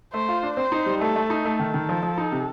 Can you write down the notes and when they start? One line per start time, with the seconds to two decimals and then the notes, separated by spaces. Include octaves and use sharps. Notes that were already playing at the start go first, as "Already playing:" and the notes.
0.13 A3 C5
0.28 F4
0.43 D4
0.57 C4 C5
0.72 D#4
0.86 G3
1.01 A3 A4
1.16 A3
1.30 D#4
1.45 A3 A4
1.60 D#3
1.74 D#3
1.89 F3
2.03 F3
2.18 D#4
2.32 C3